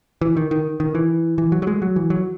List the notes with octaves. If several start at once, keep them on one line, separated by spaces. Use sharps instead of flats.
E3
D#3
D#3
D#3
E3
E3
F#3
F#3
G#3
F#3
E3
F#3